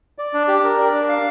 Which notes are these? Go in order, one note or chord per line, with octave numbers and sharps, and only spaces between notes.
D5
D4
G4
A#4
D5
D4
F5